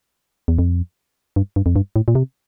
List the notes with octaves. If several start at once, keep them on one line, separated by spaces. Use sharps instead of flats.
E2
F2
G2
G2
F2
G2
A2
A#2
C3